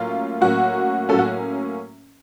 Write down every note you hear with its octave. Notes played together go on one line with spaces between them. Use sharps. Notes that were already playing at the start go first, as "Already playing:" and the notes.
Already playing: A2 F#3 A#3 C#4 F4
A2 F#3 A#3 C#4 F#4
A2 F#3 A#3 C#4 A4
F#4